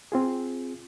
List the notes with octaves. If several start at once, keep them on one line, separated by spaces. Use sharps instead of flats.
C4 F4 G#4